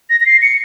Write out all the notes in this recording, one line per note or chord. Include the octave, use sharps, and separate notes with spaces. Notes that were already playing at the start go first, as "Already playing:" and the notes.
A#6
A#6
C7
C#7